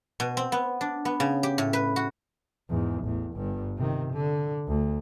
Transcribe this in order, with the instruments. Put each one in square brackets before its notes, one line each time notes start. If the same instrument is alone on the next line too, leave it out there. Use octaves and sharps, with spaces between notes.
[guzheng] B2
C4
B3
D4
B3
C#3
G4
A2
B4
F#4
[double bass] E2 G#2
A1 E2
G1 G2
C3 D#3
D3
D2